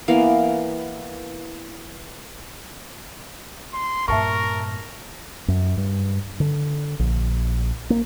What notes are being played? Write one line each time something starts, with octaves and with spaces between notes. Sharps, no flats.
E3 A#3 B3 F5
C6
G2 A#2 A#4 E5 A5 C#6
F#2
G2
D3
A#1
A#3